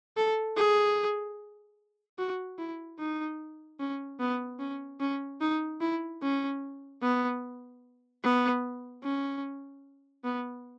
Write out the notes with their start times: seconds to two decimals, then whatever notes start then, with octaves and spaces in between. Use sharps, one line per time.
0.17 A4
0.57 G#4
2.19 F#4
2.59 E4
2.99 D#4
3.80 C#4
4.20 B3
4.60 C#4
5.01 C#4
5.41 D#4
5.81 E4
6.22 C#4
7.03 B3
8.24 B3
9.04 C#4
10.25 B3